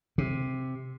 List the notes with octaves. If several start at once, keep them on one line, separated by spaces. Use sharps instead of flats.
C3